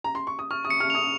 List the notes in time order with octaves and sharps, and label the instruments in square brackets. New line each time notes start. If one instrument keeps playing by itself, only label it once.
[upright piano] A#5
C6
C#6
D#6
[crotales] C#6 [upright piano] F6
[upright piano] D#6
[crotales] C#7
[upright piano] F6
[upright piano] D#6 [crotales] F7